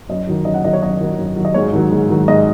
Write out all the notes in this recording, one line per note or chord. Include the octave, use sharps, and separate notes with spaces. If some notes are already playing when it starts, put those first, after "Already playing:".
F#2 D#5
D#3 F#3
F#2 D#5
F#5
D#3 F#3 D#5
C#5
F#2 D#5
D#3 F#3
F#2
D#3 F#3
D#5
G#2 C#5
D#3 F#3
G#2
D#3 F#3
G#2 D#5